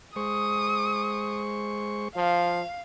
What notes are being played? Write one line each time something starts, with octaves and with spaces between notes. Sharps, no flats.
G#3 C5 C#6 D#6
F3 F5